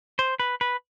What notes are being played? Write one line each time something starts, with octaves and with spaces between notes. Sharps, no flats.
C5
B4
B4